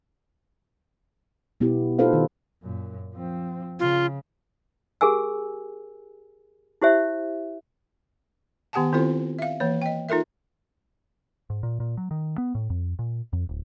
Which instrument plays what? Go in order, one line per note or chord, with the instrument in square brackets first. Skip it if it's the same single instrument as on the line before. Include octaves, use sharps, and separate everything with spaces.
[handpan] B2 B3 E4 G4
D#4 F4 A4 B4 C5 F5
D#3
[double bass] F#2 A#2
F3 C4
[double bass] C#3 [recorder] F4
[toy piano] G4 G#4 A#4 G#5 E6
E4 G4 C5 E5
[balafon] D#3 B3 G4 F#5 G#5 A5
D#3 C4 E4 F4 A4 C5
E5 F5
E3 A#3 C#5
D#5 G5
D#4 F4 A4 A#4 E5
[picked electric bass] G#2
A#2
A#2
F#3
D#3
B3
A2
F2
A#2
F2
D1